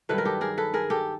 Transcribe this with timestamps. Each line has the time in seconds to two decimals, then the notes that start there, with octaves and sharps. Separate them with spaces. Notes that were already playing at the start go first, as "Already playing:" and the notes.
0.09 G2 D#3 F#3 A4 B4
0.18 A#4
0.25 G4 A4
0.41 G#4 A#4
0.58 A4 B4
0.74 G#4 A#4
0.90 G4 A4